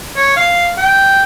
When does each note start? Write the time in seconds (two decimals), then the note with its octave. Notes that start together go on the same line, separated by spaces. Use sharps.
0.16 C#5
0.37 F5
0.78 G5